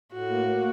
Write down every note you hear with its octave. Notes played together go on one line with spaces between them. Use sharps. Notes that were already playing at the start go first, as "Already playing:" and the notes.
A2 F#4
A#3
A#3